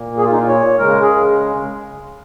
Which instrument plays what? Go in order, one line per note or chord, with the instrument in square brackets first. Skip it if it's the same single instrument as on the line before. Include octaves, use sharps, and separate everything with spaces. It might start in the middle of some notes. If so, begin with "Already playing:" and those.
Already playing: [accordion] A#2 A#3
G#4
F4
D#4
F4
C#5
C#3 G#3 A#4
G#4